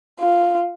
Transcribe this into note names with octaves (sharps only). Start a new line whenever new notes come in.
F4